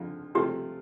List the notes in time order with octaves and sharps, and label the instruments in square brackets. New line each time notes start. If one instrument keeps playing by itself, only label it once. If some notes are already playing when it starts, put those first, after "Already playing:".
Already playing: [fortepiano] F2 D3 F3
[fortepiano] C3 F3 A3 [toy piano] G4